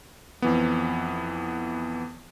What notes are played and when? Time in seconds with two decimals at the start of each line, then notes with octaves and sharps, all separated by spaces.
0.42 F2 E3 B3